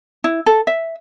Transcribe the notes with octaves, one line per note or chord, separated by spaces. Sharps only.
E4
A4
E5